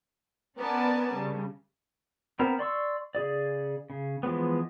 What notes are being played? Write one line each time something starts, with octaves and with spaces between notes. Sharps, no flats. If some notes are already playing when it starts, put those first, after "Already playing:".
B3 C#4 A#4 D5 G#5 A5
C#3 G3
B3 C4 A#4 C5 A#5
D5 C6 C#6 E6
C#3 G#4 D5
C#3
E3 F3 G#3 B3